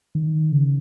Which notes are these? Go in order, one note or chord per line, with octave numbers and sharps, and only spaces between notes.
D#3
C#3